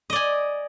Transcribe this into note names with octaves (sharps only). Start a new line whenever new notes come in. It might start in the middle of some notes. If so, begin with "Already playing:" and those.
D5 D#5 G#5